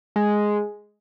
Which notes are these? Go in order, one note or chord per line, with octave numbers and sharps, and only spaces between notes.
G#3